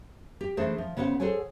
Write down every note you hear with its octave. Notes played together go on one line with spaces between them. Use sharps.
G4
E3 A3 D4 G#4 C5
F3
C#3 B3 C5 C#5 F#5
G#4 A4 C5 C#5 F#5 G#5